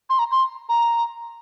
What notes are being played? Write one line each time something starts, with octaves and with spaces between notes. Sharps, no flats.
C6
A#5
C6
A#5